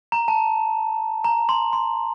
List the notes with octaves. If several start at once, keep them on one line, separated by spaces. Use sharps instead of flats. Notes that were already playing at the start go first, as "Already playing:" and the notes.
A#5
A5
A#5
C6
C6